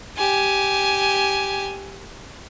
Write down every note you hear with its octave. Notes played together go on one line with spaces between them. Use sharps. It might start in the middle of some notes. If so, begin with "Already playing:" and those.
G4 G#5